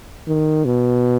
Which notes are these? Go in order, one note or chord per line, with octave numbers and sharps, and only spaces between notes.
D#3
B2